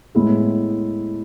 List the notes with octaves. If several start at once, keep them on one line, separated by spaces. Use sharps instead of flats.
A2 G#3 B3 E4 G#4